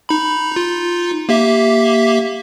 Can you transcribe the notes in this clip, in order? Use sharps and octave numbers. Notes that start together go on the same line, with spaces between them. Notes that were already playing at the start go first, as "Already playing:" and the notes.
D#4 B5
D#4 F4
A#3 G4 E5